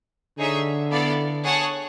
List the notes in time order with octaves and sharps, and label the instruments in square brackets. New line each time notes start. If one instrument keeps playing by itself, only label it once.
[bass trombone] D3 [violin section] D#4 G#4 C#5 E5
[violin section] B3 E4 A4 D5 F5
G#4 C#5 F#5 A5